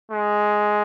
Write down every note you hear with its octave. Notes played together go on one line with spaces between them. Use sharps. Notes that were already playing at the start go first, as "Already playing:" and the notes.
G#3